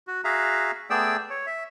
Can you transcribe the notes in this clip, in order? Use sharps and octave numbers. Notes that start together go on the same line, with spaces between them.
F#4
F#4 G#4 E5 F5 A#5
A3 B3 G#4 D5 G5 E6
C#5
E5